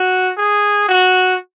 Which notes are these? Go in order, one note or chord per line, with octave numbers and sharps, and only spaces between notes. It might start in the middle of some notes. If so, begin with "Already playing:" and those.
Already playing: F#4
G#4
F#4